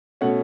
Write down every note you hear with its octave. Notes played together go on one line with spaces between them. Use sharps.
B2 A3 C#4 F#5